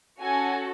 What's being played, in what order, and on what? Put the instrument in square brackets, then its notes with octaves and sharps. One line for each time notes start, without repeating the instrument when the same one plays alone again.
[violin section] C#4 F#4 A4 G#5